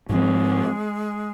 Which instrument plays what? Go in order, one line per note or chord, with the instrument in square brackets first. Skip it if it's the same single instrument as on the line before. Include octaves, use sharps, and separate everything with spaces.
[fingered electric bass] G#2 F3 C4 [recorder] G#3